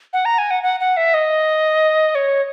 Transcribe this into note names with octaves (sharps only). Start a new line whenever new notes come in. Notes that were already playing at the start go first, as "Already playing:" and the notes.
F#5
A#5
G#5
F#5
F#5
F#5
E5
D#5
C#5